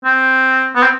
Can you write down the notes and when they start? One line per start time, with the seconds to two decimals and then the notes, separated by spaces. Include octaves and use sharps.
0.04 C4
0.75 B3
0.83 C4